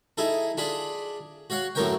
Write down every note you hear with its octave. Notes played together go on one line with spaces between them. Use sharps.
D#4 E4 G#4 A4
D4 F4 G#4 B5
F#4 C#5 F5 F#5
F#2 A2 C4 A#4 C#5 G5